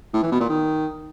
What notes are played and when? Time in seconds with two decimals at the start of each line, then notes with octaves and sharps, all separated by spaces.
0.14 A2
0.23 E3
0.32 B2
0.40 A#2
0.49 D#3